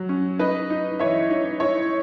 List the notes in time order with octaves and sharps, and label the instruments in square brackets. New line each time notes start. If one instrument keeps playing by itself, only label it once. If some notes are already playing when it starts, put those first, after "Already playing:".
Already playing: [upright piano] F#3
C#4
D#4 B4 D#5
D#4
E3 C#5 E5
D#4
E4 C#5 E5